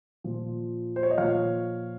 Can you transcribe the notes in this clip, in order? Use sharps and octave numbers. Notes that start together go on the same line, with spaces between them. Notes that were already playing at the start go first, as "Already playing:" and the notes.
A#2 F3
C5
C#5
D#5
A#2 F3 C#5 F5